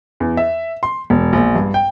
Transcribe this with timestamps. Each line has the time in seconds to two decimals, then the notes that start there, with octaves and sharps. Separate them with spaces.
0.20 E2
0.37 E5
0.83 C6
1.10 E1
1.33 A#1
1.56 G2
1.74 G5